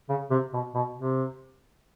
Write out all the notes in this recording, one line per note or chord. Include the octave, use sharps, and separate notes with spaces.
C#3
C3
B2
B2
C3